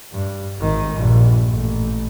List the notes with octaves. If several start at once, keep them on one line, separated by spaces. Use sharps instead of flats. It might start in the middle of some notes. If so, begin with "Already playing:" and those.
G2
G#1 D#3
A#1 G2
A1